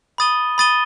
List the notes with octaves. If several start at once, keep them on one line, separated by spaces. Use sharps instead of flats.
B5 D#6 A6 D#7 G7
B5 D#6 A6 D#7 G7